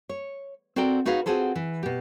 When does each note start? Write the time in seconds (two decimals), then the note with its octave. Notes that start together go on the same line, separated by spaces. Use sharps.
0.09 C#5
0.76 C4 F#4 A4 A#4 D5 G5
1.06 D#4 F#4 G#4 B4 C#5 F5
1.26 C4 F4 F#4 G#4 A4 C5
1.55 E3
1.83 B2 G4